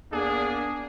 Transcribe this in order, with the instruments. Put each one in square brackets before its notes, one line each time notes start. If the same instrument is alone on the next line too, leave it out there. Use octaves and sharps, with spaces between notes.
[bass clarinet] E2 [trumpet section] A#3 D4 G#4